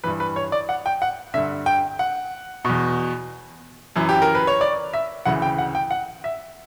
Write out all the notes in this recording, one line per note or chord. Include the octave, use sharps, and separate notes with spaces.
G2 E3 B4
B4
C#5
D5
F#5
G5
F#5
G2 D3 E5
G5
F#5
E2 B2
F#2 E3
G4
A#4
B4
C#5
D5
E5
D2 C#3 E3 F#5
G5
F#5
G5
F#5
E5